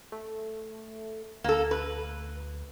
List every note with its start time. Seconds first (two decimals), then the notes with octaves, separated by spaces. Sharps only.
0.12 A3
1.44 D2 A#3 A4
1.71 B4